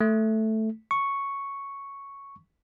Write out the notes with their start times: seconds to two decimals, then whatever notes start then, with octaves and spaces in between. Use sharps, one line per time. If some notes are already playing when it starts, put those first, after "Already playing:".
0.01 A3
0.91 C#6